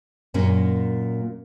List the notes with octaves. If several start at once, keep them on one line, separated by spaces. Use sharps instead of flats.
F#2 A#2 A#3 C#4